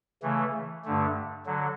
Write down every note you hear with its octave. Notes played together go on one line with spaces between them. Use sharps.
C#3 E3 A3
G2 D3 A3
D3 F#3